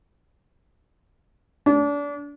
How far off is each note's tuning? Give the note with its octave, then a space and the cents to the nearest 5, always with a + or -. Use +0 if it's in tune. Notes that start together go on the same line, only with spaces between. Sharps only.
D4 -30